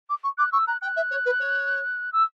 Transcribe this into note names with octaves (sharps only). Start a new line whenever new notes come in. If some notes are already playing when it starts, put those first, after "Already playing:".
D6
C#6
D6 F#6
C#6 E6
A#5 F#6
G5 F#6
E5
C#5
B4
C#5
E6